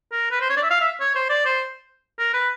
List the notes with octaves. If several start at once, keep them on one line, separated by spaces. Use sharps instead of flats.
A#4
B4
C5
C#5
D5
E5
F5
E5
C#5
C5
D5
C5
A#4
B4